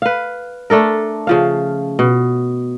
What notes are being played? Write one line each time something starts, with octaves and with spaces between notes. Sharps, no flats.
B4 F5
A3 D4 A4 A#4
C#3 F3 F5
B2